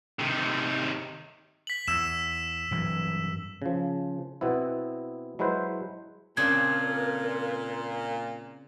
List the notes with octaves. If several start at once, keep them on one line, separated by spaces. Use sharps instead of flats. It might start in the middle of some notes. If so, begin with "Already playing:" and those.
C3 D#3
B6 F#7
E2 E6 E7
G2 E3 F#3
C#3 F3
B2 B3 C4 E4
F#3 G#3 E4 B4 C5
A#2 C#3 C4 D4 A#4 G#6